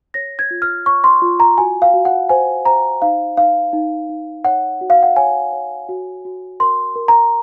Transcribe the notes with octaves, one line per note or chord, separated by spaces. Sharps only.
C#5 A#6
G#6
F4
F6
C#5 C#6
C6
F4
A#5
F#4 G#5
F5
F#4
F#5
C5 G#5
C5 A#5
D#4 F5
D#4 F5
D#4
D#4
C#5 F#5
F#4
F5
F#5
C#5 G#5
C#5
F#4
F#4
A#4 C6
A#4
A#5